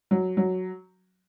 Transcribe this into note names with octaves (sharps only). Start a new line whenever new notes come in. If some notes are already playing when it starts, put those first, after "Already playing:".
F#3
F#3